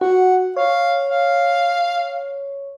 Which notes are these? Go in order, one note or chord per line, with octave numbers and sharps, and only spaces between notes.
F#4 F#5
C#5 F5
F5